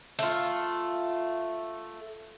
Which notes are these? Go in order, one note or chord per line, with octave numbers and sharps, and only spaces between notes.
A3 F4